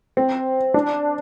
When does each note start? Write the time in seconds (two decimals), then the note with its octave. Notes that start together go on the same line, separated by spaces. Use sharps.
0.17 C4
0.74 D4